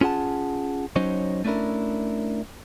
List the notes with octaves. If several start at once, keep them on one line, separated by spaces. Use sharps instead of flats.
C#4 F4 G#4 F#5 A5
F#3 C#4 D#4 C5 C#5
A3 C#4 D4 E4 A#4